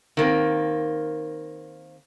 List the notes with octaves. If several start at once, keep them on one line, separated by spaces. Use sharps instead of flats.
D#3 A#3 C4